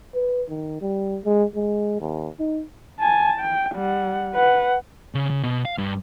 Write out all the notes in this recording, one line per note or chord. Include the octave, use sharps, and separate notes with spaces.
B4
D#3
G3
G#3
G#3
D#2
D#4
G#5 A5
G5
G3 F#5
B4 F#5
C#3
C#3
B2
F5
G2